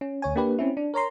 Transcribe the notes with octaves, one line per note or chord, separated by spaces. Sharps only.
C#4
D2 C#5 G#5
A#3 D4 G4 B4
C4 C#4 E4
D4
A#4 C#5 A#5 C6